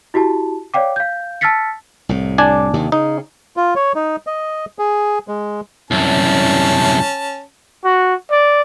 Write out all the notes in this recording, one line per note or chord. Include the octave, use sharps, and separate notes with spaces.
E4 F#4 G4 A5
C#5 D5 F5 G5 D6
F5 G6
A5 E6 F6 A6 B6 C#7
C2 A2
D4 D5 G#5
D#2 C3 D#3
C#3 D#4
F4
C#5
D#4
D#5
G#4
G#3
C2 F#2 C#4 A5
F#4
D5